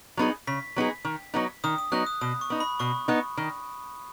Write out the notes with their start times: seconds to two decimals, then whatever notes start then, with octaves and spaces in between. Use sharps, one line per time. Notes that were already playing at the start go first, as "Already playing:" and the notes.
0.17 F#3 B3 D#4 G#4
0.47 C#3 B6
0.76 F#3 B3 D#4 G#4
1.05 D#3
1.34 F#3 B3 D#4
1.64 D#3 D#6
1.78 D#6
1.92 F#3 B3 D#4 F#6
2.07 D#6
2.21 B2 D#6
2.41 C#6
2.50 B3 D#4
2.60 B5
2.80 B2 C#6
3.08 B3 D#4
3.37 D#3